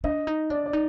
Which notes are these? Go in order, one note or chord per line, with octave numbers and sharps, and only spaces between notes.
D4 D#5
D#4
D4 D5
D5
D#4